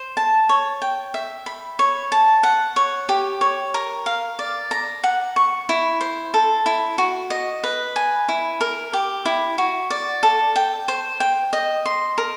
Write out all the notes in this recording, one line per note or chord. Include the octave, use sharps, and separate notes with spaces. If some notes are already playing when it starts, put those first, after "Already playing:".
Already playing: C5
A5
C#5
G5
E5
B5
C#5
A5
F#5
C#5
G4
C#5
A#4
F5
D5
A#5
F#5
C#6
E4
C5
A4
E4
F#4
D#5
B4
G#5
E4
A#4
G4
E4
F#4
D5
A4
G5
C5
G5
D#5
C6
A#4